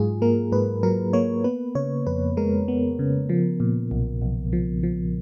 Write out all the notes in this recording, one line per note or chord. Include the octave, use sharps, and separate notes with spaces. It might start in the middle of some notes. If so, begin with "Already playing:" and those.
Already playing: G#2 F#3 F4 G#4
A#3 A#4
G#2 B4
F#3 A#4
A#3 C#5
B3 B4
C#3 C#5
F2 B4
G#3 A#4
B3
C#3
F3
A#2
B1
B1
F3
F3